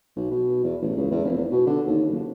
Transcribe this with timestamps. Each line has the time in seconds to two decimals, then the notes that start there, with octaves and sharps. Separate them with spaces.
0.16 B1
0.31 B2
0.64 E2
0.82 A1
0.97 C#2
1.11 E2
1.24 F1
1.51 B2
1.67 D3
1.87 D#2
2.10 F#1